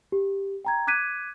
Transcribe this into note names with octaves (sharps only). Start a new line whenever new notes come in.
G4
G5 A#5 G#6
D6 F#6 G#6 B6 D#7